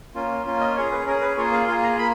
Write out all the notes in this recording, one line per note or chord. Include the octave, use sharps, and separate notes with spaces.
A#3 C#4 F4
A#3 C#4 F4
D#5
C#4 G#4 C#5
B4
C#4 G#4 A#4
B4
A#3 F4 G#4 C#5
F5
A#3 F4 G#4 F5
A#5
A#3 B5